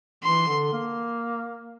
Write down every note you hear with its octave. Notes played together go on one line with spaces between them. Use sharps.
E3 C6
D3
A#3